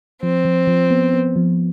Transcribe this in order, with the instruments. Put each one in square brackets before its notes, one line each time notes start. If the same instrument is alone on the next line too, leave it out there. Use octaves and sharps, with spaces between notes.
[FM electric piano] F3 [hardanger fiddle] C4
[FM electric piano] F3
F3
B3
B3
F3